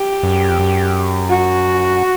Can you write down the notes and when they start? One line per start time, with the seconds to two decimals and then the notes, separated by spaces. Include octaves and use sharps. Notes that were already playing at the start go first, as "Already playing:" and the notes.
Already playing: G4
0.23 F#2
0.50 F2
0.59 F#2
1.30 F#4